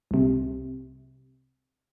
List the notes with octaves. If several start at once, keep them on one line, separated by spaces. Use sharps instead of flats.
C2 C3